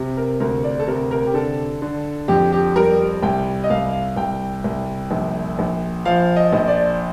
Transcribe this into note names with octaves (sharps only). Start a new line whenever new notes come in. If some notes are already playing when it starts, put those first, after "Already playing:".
Already playing: C3
A#4
D2 A#4
D5
A4
C3 A#4
A#4
G4
D3 A4
D3
F2 G4
G4
G3 A#4
C2 G5
D#5
C2 F5
F5
C2 G5
C2
A#1
A#1
F3 F5
D#5
A#1
D5